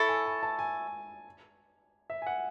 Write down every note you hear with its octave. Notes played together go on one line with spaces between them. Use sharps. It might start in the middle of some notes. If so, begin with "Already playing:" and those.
Already playing: E4 A4 C#5
G#5
G#5
A5
G#5
E5
G#5
F#5